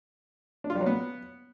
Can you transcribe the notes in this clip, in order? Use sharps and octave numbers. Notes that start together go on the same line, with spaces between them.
D4
F4
G3
F#3
B3